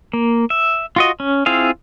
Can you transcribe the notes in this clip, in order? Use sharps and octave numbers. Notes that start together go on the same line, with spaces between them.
A#3
E5
F4 F#4 D#5
C#4
C4 E4 F4 G#4 F5